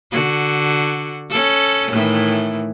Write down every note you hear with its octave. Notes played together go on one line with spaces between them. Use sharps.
D3 F#4
C#4 A4
A2 D#3 E3